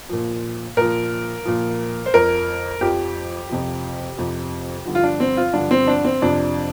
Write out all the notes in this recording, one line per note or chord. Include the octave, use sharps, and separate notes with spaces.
A#2 F3
A#2 F3 A#4
A#2 F3
C5
F2 F3 A#4
F2 F3 G4
F2 C3 F3
F2 C3 F3
G2 D3 F3
F4
D4
C4
F4
G2 D3 F3 D4
C4
D4
C4
F2 C3 F3 D4